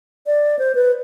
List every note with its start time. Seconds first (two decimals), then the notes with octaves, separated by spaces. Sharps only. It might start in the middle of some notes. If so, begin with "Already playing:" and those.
0.27 D5
0.59 C5
0.75 B4